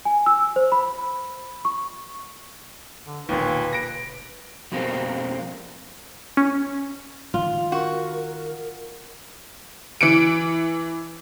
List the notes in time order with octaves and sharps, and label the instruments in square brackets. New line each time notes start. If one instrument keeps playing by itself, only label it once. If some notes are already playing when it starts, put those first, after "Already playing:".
[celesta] G#5
E6
C5
B5
C#6
[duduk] D3
[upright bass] E1 D3 [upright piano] D#2 A#2 [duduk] B4
[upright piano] A#6 D7
[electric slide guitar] F2 B2 G3 A#3 C4
[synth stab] C#4
[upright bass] D#3 [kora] F4
[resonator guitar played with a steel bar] F#4 [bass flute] A#4
[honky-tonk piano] E3 C#7 D7